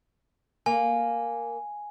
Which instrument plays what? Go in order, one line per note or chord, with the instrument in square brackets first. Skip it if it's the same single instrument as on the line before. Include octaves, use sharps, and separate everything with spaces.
[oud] A#3 [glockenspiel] G#5